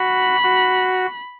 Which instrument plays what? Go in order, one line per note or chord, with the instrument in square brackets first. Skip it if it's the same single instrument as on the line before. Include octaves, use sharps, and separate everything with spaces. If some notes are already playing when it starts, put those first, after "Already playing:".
Already playing: [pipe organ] F#4 [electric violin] B5
[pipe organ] F#4